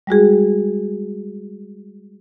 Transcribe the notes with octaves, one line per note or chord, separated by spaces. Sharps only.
G3 G#3 F#4 G#4